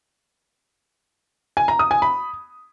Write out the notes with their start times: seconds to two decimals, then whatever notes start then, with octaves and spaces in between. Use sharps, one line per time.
1.57 G#5
1.68 A#5
1.79 D#6
1.91 G#5
2.02 B5